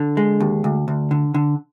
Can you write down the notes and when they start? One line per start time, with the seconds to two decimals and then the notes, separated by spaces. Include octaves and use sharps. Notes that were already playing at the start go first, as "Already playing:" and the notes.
Already playing: D3
0.17 G#3
0.40 D#2
0.64 D2
0.88 D2
1.11 D3
1.34 D3